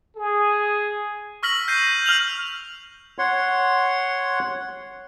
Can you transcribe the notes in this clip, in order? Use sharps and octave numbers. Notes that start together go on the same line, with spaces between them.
G#4
C#6 E6 F6 A#6 B6 F#7
G6 C7 D#7
F6 F7 F#7
C#5 F#5 C6